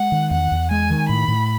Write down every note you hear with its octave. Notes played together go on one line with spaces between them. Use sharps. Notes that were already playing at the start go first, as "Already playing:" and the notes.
Already playing: G#3 F#5
D#3
E2 F#5
E2
G#3 G#5
D#3
A2 B5
A2